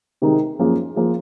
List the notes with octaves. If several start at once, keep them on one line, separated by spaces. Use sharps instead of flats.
C3 D#3 G#3 D#4 A#4
F#2 F3 A#3 F4 G#4
F3 A#3 F4 G#4